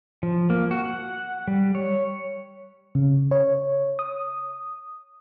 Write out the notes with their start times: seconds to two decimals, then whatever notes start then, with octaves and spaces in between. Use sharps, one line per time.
0.23 F3
0.50 A#3
0.71 F#4
0.85 F#5
1.48 G3
1.75 C#5
2.95 C#3
3.31 C#5
3.99 D#6